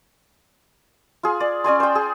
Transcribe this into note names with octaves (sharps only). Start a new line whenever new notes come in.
F4 G#4
D5
C#4 D5 G#5 C6
C5 G5
G#4